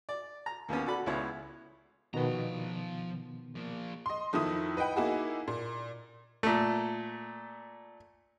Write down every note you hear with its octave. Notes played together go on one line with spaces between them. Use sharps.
D5
A#5
D#2 A#3 B3 C#4
F#4 A4 D5 B5
C#2 B3 E4 C#5
B2 D#3 F3 B3 A#5
F3 A#3
D#5 C6
F2 D#3 F3 E4 D#6
B4 D#5 F#5 G5 B5
A#3 D#4 E4 F#4 G#4
A#2
A#2 A3